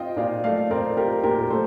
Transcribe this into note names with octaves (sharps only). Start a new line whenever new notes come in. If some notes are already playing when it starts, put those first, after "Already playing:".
Already playing: C4 F4 D#5 G5
A#2 D5 F5
A3 D5 F5
C4 A#4 D5
F4 G4 A#4
A#2 G4 A#4
A#4
A3 A4 C5